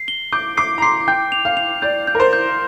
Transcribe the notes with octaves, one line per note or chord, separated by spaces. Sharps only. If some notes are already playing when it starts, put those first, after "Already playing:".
Already playing: C7
G7
D6 G6
D6 C7
A#5
C6 C7
G5 G6
F7
F5
F7
D5 G6
G6
A#4
C5
G6